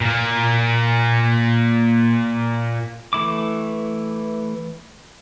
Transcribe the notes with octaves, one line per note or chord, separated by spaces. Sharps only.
A#2 A#3
E3 A3 E4 D6